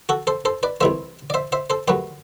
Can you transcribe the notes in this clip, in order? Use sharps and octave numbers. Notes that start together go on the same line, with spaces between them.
F#4 A4
A4 C5
A4 C5
B4 D5
C2 C3 E3 A3 C5 E5
D5
C5 E5
C5 E5
A4 C5
F#2 F#3 A3 G4 B4